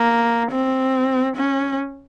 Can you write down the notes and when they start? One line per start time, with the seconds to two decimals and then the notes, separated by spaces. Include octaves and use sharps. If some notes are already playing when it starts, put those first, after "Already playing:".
Already playing: A#3
0.51 C4
1.37 C#4